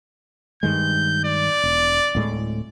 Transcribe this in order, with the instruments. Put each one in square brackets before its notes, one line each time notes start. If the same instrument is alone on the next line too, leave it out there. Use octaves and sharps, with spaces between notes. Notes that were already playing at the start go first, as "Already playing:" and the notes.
[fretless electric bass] G2 D#3 G#3 [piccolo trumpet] G6
[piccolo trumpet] D5
[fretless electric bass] E1
D1 A2 G#3